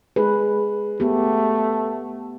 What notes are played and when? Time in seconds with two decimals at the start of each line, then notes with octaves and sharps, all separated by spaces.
0.16 G#3 B4
1.00 A3 B3 G4